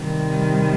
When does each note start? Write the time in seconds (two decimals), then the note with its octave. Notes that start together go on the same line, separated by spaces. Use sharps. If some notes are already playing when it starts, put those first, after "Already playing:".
Already playing: C3 D#3 G3